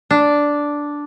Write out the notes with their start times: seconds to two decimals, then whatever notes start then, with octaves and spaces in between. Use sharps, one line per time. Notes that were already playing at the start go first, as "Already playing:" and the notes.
0.11 D4